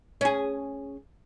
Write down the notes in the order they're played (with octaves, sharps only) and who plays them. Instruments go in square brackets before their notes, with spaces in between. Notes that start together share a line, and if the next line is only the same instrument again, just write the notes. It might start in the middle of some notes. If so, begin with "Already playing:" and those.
[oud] C#4 G#4